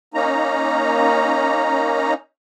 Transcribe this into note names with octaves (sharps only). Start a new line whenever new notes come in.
A#3 C#4 D#4 A#5